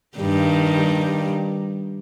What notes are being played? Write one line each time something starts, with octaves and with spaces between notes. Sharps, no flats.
G2 D#3 G3